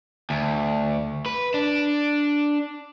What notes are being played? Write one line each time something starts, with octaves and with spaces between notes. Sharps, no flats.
D2
B4
D4